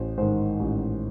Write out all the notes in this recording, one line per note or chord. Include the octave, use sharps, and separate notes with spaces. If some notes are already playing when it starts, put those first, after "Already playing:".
Already playing: A1 C5
G#2 D#3 C5
A1